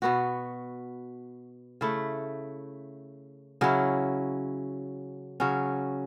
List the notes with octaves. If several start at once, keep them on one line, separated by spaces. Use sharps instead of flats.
B2 B3 F#4
C#3 A3 E4
C#3 F#3 C#4 E4
C#3 F#3 C#4